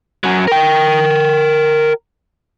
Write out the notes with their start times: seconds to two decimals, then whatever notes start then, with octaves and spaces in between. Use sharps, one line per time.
0.24 F#2 F#3
0.48 A#4 G5